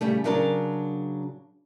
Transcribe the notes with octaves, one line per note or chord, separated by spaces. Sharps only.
C#3 G3 A3
C#3 F#3 D4 A#4 E5 A5